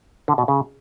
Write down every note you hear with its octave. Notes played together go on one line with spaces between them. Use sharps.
D3
B2
C#3